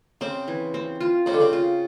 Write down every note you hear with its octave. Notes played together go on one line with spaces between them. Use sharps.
C#3 C4
E3
C4
F4
C#3 C4
D3
C#3
F4